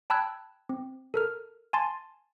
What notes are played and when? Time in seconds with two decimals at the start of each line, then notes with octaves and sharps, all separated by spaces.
0.10 G5 A5 B5 E6 F#6 G#6
0.69 C4
1.14 A4 A#4 F6
1.73 G#5 A5 C6 A6